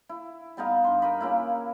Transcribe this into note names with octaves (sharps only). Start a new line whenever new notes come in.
E4
G3 B3 D#4 F5
G2 C6
A#4 D#5 B5
C#3 A#3 E4